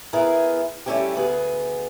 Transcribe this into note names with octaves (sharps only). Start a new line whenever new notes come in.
B3 E4 G#4 A#4
G3 A3 A#3 C#4 E4 G4
D2 B3 G#4